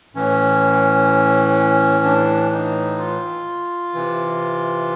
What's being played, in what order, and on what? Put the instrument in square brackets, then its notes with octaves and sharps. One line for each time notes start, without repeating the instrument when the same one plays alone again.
[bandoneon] A2 E3 C#4
D4
D#4
F4
C3 E3